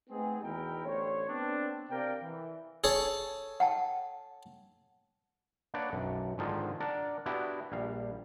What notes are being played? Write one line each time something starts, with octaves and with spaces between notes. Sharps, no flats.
A3 B3 C4 D#4 G#4
E2 B2 D#3 E4 A#4 G5
A1 D3 C5 C#5
B3 C4 D4
C3 C4 A#4 D5 F5 G5
E3
G#4 A4 C#5
F#5 G5 A5
A#3 D4 B4 C#5 D5 F#5
B1 F#2
G#2 D3 D#3 F3 F4
D4 A#4 D5 F#5 A5
B3 D4 E4 F#4 G4
A#1 G3 F5